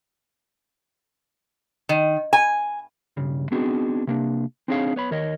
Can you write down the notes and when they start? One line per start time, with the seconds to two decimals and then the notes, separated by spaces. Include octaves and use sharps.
1.89 D#3
2.33 G#5
3.17 B1 G2 C#3
3.52 B3 C4 D4 D#4 F#4 G#4
4.07 C3 A#3 D4
4.68 C4 D4 D#4 G#4 C#5 F5
4.96 B3 C#5 B5
5.11 D#2 D#3 A#4 C#5 D#5